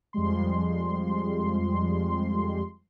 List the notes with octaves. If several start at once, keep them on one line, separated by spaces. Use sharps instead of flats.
F2 F3 G3 G#3 C6